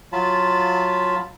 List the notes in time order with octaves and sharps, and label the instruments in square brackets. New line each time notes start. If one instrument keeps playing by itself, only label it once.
[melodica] F#3 F4 A5 B5